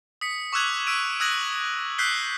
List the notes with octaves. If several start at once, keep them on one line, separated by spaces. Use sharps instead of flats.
D#6 B6 C#7
C#6 D6 E6 F#6 G#6 F7
E6 B6 D7 D#7
D#6 E6 F#6 G#6 A#6 F#7
E6 F#6 G6 B6 C7 G7